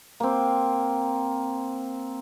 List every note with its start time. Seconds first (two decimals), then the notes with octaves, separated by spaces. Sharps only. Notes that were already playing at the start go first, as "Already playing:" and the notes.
0.20 A#3 C4